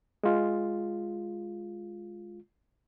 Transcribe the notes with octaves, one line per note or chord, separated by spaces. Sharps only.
G#3 F4